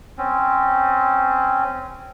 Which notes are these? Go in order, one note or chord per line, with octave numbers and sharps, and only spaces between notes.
C4 C#4